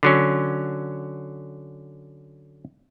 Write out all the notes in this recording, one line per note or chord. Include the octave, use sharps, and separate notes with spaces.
D3 F#3 C#4